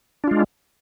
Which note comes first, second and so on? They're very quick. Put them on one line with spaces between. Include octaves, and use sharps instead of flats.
D4 F4 G#3